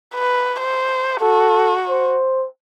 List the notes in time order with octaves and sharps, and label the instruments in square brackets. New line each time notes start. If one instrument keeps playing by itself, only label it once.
[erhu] B4
C5
[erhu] F#4 [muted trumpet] A4
[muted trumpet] C5